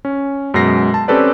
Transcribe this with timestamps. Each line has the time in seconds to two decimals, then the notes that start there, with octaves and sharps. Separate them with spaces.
0.05 C#4
0.54 F#2 B2 G#3 A#6 C7
0.94 A5
1.08 C4 C#4 G4 A4 B4 D5